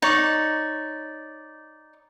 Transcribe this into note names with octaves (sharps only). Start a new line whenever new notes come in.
D#4 C#5 D5